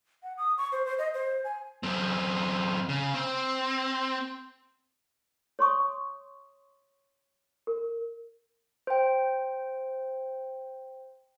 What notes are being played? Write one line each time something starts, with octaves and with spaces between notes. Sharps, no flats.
F#5
D#6
C#6
C5
C5
D#5
C5
G#5
F#2 C4
C#3
C4
C#5 C6 C#6 D#6
A#4
C5 G5